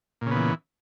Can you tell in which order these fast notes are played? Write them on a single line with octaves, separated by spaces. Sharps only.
A#2 C#3 B3 E3